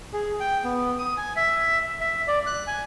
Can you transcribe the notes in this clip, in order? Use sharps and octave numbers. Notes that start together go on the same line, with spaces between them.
G#4
G5
B3
D#6
G#5
E5
E5
D5
F#6
G#5